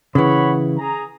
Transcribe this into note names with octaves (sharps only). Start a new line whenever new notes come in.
C#3 E3 C#5 F#5 B5
G#4 A#5